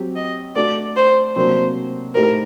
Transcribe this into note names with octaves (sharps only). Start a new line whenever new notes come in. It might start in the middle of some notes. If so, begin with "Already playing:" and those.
Already playing: F#3 C4 G4
D#5
A3 D4 F#4 A4 D5
C5
C3 F#3 A#3 D4 C5
A2 A3 D#4 G4 A#4 C5